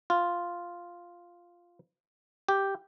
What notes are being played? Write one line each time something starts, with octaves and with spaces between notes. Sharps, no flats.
F4
G4